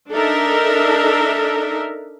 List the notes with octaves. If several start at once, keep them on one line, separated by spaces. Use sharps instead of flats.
D4 D#4 A4 A#4 E5